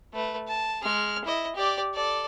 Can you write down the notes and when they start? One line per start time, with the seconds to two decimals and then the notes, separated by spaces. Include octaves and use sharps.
0.13 A3 B4
0.48 A5
0.82 G#3 F6
1.25 E4 D#5
1.55 G4 D5
1.94 A4 D5